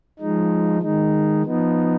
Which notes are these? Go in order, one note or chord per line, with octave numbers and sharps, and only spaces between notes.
F3 G#3 D#4
D#3 G#3 D#4
F3 B3 D#4